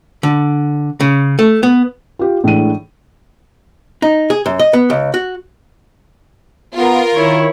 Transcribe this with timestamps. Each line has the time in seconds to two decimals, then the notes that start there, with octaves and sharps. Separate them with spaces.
0.23 D3
1.00 C#3
1.39 A3
1.63 B3
2.19 F4 G4
2.44 A2 E3 G#3 D4 D#7
4.02 D#4
4.30 G#4
4.46 F#2
4.59 D#5
4.73 B3
4.90 C#2
5.14 F#4
6.75 B3 F4 A#4
7.15 D#3 E4 C#5